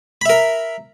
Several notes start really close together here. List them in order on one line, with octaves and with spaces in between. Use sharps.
B5 E5 A#4